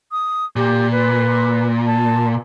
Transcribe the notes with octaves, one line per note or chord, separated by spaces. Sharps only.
D#6
A#2 G4
B4
A5